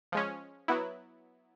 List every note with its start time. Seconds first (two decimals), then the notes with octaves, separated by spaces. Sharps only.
0.12 F3 G#3 C#4
0.68 F#3 B3 E4